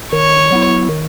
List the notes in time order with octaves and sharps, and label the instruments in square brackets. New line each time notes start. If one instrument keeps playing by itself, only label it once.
[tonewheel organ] D#3 [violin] C#5
[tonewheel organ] F#3 B3 E4
D#3